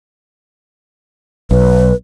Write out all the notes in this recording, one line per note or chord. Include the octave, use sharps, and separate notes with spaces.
B1 B4